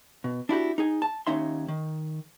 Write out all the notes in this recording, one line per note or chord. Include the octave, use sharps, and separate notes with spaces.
B2
D4 E4 F#4 G4
D#4 G#4 G#5
A5
D#2 C#4 D#4 E5 C6
D#3